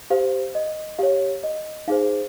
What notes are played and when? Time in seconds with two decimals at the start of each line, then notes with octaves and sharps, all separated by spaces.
0.10 G4 C5 F5
0.55 D#5
0.99 G4 C#5 F5
1.43 D#5
1.88 D#4 G#4 C5 F5